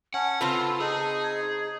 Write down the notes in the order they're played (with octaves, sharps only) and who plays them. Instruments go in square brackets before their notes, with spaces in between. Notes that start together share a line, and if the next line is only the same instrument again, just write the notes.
[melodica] C#4 [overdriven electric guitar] F#5 [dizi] A5
[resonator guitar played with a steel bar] C#3 C4 B4 [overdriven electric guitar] F4 [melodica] A4
[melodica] D#4 [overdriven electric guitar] G#4
[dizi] G#6